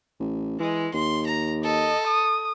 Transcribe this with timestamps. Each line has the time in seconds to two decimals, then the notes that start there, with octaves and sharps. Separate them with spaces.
0.20 A1
0.60 E3 G#3
0.94 D#2 C6
1.27 A#5
1.64 A4 D#5
2.08 D#6